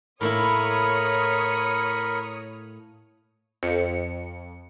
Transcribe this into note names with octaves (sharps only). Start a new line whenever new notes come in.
A2 A#3 E4 A#4 C#5 B5 D#6 C#7
F2 C#7